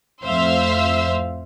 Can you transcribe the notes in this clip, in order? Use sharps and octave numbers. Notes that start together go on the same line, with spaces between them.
F2 A2 C5 E5 F5 E6